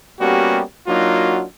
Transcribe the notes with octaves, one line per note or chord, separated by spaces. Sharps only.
G3 A#3 B3 C#4 F#4 G4
F#3 A#3 D4 D#4 F4 F#4